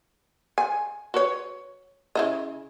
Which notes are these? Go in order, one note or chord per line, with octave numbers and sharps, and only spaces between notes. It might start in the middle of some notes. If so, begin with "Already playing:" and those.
G#5
F#4 B4 C#5
C#3 E4 D#5